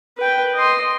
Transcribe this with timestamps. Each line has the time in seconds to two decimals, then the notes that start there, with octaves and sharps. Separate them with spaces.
0.18 B4 G5
0.54 D#5 C6